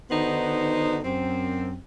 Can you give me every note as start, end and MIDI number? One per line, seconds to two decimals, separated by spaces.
0.11 0.98 50
0.11 0.98 51
0.11 0.98 59
0.11 0.98 63
0.11 0.98 66
0.11 0.98 72
1.04 1.77 42
1.04 1.77 60